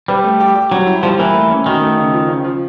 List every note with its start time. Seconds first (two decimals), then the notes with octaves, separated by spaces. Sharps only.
0.08 G3 B4
0.24 A3
0.40 G4
0.55 G4
0.71 F#3 G3
0.87 E4
1.03 F3 G3
1.18 E3 A#3
1.34 A3
1.50 C#4
1.66 D#3 F#4
1.81 A3
1.98 C#3
2.13 F3
2.28 C#3
2.44 F3